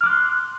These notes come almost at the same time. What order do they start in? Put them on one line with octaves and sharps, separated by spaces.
F6 D6 F#6 C6